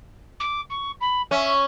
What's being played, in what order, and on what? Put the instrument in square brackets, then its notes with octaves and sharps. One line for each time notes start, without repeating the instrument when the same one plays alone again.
[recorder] D6
C#6
B5
[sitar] C#4 [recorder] E5